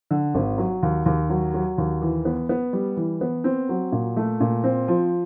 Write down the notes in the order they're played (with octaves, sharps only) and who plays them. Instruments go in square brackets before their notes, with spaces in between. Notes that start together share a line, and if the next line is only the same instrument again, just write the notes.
[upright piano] D3
G#1
F#3
D#2
D#2
F#3
F#3
D#2
E3
B3
B3
G3
E3
B3
C4
F#3
A#2
A3
A#2
C4
F3